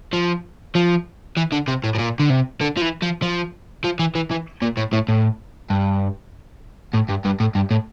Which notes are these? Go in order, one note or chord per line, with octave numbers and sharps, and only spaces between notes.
F3
F3
E3
D3
C3
A2
A2
A#2
D3
C3
D3
F3
E3
F3
F3
F3
E3
E3
E3
A#2
A2
A2
A2
G2
A2
G2
G2
A2
G2
A2